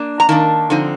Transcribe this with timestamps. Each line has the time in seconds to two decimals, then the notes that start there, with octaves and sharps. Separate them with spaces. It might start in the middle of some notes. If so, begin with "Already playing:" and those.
Already playing: A#3 D4
0.20 A#5
0.29 D#3 A#3 D4 A5
0.70 D3 F3 C4 D#4